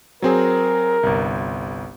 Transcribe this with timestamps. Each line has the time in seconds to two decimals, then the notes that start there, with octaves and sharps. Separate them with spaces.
0.22 F#3 C4 G#4 A#4
1.03 G1 C2